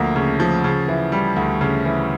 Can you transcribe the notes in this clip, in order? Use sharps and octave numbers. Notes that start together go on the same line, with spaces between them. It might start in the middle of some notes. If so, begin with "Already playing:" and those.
Already playing: D2 F3 A#3
C#3
F3
C#3
E3
G3
D2
C#3
E3